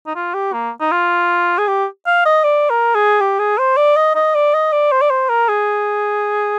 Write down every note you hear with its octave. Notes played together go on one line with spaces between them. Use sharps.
D#4
F4
G4
A#3
D#4
F4
G#4
G4
F5
D#5
D5
A#4
G#4
G4
G#4
C5
D5
D#5
D#5
D5
D#5
D5
C5
D5
C5
A#4
G#4